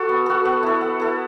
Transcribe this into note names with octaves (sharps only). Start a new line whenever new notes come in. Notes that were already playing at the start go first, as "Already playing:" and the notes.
Already playing: F#4 A4
B3
F#4 A4
B3
E4 A4
B3
E4 A4